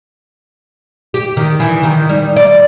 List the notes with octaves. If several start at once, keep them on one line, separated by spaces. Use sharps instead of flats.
G4
D#3
E3
D#3
G3
D5